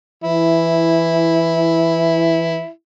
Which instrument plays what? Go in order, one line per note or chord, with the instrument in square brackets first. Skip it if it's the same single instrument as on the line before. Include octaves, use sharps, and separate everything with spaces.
[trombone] E3 [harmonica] E4